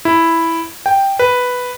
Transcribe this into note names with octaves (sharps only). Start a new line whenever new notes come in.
E4
G5
B4